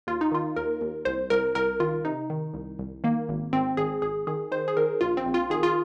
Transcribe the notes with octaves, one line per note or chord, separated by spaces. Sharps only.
D#2 F4
D#4
D#3 F4
D#2 A#4
D#2
C2 C5
C2 A#4
C2 A#4
D#3 F4
C3 D#4
D#3
C2
C2
D#3 A#3
G#1
G#1 C4
G#1 G#4
G#1 G#4
D#3 G#4
D#3 C5
G#4
D#3 A#4
A#1 F4
C4
A#1
F4
D#3 G#4
F4